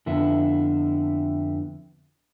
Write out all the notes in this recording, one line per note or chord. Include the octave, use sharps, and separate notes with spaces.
F2 D3 B3 E4